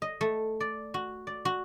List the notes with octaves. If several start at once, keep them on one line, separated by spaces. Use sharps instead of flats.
D#5
A3
D5
F#4
D5
F#4